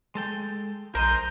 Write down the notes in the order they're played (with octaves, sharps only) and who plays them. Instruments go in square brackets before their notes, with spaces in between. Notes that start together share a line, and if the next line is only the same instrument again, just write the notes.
[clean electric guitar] G#3 A4 G5
[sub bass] A#1 [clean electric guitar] A#4 C5 D#5 [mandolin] A#5 [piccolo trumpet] G6